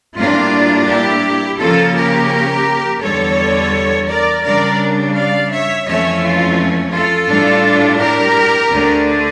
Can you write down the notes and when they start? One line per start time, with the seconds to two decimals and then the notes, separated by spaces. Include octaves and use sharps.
0.17 A2 G3 A#3 D4 F4
0.88 E4 G4
1.59 C#3 F3 A#3 C#4 F4 A4
1.95 G4 A#4
3.01 E2 D3 G3 A4 C#5
4.08 A#4 D5
4.44 C#3 G3 D4 A#4 D5
5.15 D5 F5
5.51 C#5 E5
5.86 F2 E3 A3 C#4 C#5 E5
6.22 F4
6.93 F4 A4
7.29 A2 G3 D4
7.99 G4 A#4
8.70 D2 D3 A3 D4